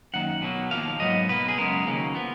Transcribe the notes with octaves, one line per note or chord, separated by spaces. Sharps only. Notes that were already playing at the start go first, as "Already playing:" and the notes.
F#2 D#3 A#3 F#5
B2 F#3 A#3
D#2 C#3 F3 A#3 F5
G#2 F#3 B3 D#5
B2 A#3 B4
G#4
F#2 C#3 G#3 B3 A#4
D#2 C#3 F#3 A#3
F3 B3